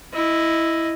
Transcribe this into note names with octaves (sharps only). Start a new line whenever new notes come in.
E4 D#5